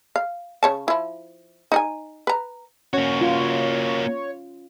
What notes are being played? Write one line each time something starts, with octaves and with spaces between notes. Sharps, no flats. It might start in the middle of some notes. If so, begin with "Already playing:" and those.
F5
C#3 C#5 A5
F3 E4
D#4 D#5 G#5
B4 A#5
A#3 C#4 F#4 C#5
F4